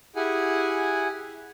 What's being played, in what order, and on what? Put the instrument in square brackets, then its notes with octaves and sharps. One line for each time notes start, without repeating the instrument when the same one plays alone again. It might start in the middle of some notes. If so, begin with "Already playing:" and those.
[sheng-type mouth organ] E4 G4 G#4 F#5 G#5